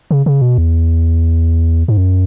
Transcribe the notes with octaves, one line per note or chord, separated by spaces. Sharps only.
C#3
C#3
B2
E2
G#2
F#2